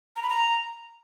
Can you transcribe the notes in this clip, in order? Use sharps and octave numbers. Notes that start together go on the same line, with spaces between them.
A#5
B5
A#5